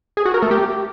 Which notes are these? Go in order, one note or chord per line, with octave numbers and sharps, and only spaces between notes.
G#4
F#4
A#4
A3
G4